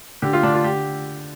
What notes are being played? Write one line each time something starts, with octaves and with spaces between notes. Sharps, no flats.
D3 G4
F4
D3 D4
F4
G4